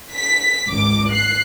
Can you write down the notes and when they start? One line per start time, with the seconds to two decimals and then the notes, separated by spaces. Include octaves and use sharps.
0.15 B6
0.69 G#1 C#2 D6
1.12 F#6 C7